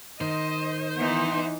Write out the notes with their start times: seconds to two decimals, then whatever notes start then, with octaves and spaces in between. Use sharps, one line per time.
0.21 D#3 C5 D#5
0.96 E3 B3 D#4